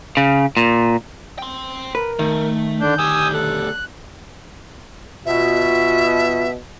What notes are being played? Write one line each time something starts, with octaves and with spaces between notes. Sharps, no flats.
C#3
A#2
G5 C6
A#4 B4
D#3 A3
D3 D4 G6
D2 G4 G#5 D#6 E6
A4 F#6
B2 F4 E5